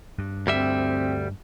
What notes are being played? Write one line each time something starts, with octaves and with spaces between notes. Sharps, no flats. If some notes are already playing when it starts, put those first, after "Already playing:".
G2
D2 G3 C4 E5